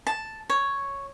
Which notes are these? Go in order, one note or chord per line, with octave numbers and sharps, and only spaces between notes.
A5
C#5